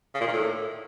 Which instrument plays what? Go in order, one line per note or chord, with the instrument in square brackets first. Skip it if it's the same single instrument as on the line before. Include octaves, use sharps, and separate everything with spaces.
[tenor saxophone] C#3
A#2
D#3
A2